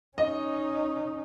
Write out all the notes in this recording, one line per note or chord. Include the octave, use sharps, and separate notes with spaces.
C#4 D#4 D#5